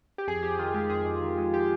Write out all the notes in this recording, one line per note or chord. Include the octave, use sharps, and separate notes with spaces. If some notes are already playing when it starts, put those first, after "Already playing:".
G4
F2 G#4
F2 G4
D#3 F4
G#3 G4
F2 G#4
F2
D#3
G#3
G4